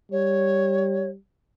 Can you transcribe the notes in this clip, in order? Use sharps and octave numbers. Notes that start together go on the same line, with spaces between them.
G3 C#5